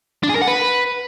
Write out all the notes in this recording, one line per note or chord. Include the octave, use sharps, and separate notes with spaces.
D4
G#4
A#4
F#5
B4